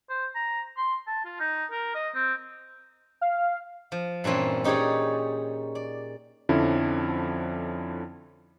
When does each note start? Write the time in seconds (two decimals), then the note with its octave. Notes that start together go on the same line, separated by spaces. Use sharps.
0.09 C5
0.35 A#5
0.77 C6
1.07 A5
1.25 F4
1.40 D#4
1.71 A#4
1.95 D#5
2.14 C4
3.21 F5
3.92 F3
4.24 G2 A#2 E3 C4 C#4
4.64 C#4 D#4 G4 G#4 C#5 D5
5.75 D5
6.49 F2 D3 F3 C#4 E4